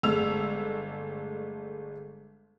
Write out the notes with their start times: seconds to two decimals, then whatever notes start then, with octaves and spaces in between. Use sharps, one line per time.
0.03 G1 G#3 A3 E6 F7